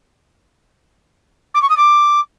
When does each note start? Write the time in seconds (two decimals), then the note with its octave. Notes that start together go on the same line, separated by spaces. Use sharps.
1.54 D6
1.62 C#6
1.69 D#6
1.77 D6